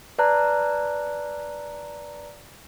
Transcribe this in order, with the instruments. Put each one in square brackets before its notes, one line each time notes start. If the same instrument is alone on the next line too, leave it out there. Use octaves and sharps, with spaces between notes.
[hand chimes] B4 D5 A5 A#5 F#6